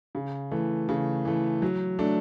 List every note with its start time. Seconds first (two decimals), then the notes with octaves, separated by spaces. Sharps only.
0.15 C#3
0.51 E3 A3
0.89 C#3
1.25 E3 A3
1.62 F#3
1.99 A3 D4